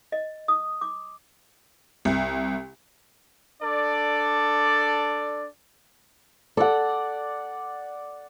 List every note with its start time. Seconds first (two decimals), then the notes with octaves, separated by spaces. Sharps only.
0.12 D#5
0.48 D#6
0.81 D6
2.05 C2
3.61 D4 A4 D5
6.57 A4 D5 F#5